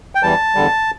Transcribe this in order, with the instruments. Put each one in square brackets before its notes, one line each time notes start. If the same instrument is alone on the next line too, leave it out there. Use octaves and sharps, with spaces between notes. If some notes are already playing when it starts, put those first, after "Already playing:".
[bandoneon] G5
E2 E3 G3 A5
E2 D3 G3